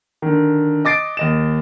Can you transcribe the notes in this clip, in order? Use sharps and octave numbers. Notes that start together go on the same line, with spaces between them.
D3 D#3
D#5 D6 A6 C7 D7
D#2 D#5 E7